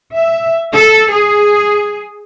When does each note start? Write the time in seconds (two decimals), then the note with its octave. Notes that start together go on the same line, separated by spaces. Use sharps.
0.14 E5
0.72 A4
1.12 G#4